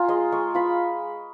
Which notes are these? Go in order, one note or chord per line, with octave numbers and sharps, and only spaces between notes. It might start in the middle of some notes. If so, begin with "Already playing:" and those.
Already playing: F4 G#5 A#5
G#3 D#5
G#3 C#6
F4 B5